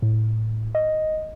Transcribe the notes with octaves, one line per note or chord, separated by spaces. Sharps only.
A2
D#5